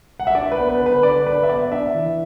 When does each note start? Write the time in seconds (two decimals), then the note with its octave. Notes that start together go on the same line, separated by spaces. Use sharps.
0.20 F#5
0.27 E5
0.35 D4 D5
0.52 B4
0.58 B3
0.69 B4
0.81 D3
0.86 B4
1.03 D3 D5
1.26 D4 B4
1.43 E5
1.49 B3 D5
1.72 D4 E5
1.95 E3